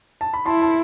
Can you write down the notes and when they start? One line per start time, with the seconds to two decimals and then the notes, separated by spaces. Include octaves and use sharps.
0.21 A5
0.34 B5
0.46 E4 A5 C6
0.62 A5 C6